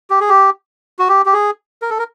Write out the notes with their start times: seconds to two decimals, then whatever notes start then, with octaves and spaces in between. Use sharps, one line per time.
0.10 G4
0.20 G#4
0.29 G4
0.99 F#4
1.09 G4
1.26 G4
1.33 G#4
1.82 A#4
1.90 A4
1.99 A#4